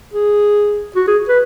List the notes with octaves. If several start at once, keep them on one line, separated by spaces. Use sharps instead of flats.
G#4
F#4
G#4
B4